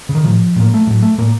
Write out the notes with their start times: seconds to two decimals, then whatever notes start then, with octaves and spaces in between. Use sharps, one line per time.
0.09 C#3
0.15 D#3
0.24 A2 F3
0.56 A2 A#3
0.74 A3
0.87 A2 F#3
1.02 A3
1.18 A2 A#3